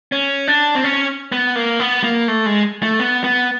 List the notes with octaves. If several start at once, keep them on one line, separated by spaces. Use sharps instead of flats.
C#4
D4
C4
C#4
B3
A#3
B3
A#3
A3
G#3
A3
B3
B3